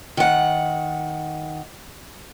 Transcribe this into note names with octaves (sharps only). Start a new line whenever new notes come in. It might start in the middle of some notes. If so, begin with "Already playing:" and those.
D#3 F#5